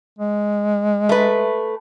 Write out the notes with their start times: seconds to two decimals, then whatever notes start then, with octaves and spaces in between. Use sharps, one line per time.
0.18 G#3
1.09 A3 B4